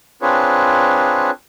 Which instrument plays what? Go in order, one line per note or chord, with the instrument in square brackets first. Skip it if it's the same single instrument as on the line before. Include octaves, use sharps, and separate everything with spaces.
[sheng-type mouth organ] C4 D4 F4 G#4 B4 C#5